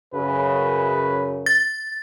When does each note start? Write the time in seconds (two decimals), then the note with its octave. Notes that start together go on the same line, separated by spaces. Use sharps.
0.14 F#2 C#3 B4
1.46 A6